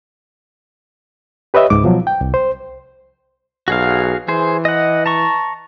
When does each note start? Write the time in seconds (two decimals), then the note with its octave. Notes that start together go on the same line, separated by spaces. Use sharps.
1.54 G4 B4 C#5 D#5 E5
1.70 C#2 G#2 D6
1.83 B2 F3 F#3
2.07 G5
2.21 C2
2.34 C5
3.68 B1 F#4 G#4 F5
4.28 E3 G#4 C5
4.65 D#5 F#5
5.06 A5 A#5 C#6